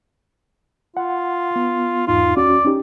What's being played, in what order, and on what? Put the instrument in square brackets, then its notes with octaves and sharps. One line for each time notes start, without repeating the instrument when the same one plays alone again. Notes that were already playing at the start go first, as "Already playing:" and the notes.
[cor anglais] F4 [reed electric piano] F#5
[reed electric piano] B3
[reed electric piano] E2 G#2 D#4 [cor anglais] F4
[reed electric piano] D#2 C#4 F#4 [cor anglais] D5
[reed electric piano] C#4 D#4 G4